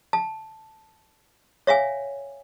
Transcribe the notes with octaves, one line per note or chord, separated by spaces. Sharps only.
A5
C#5 E5 F5 G#5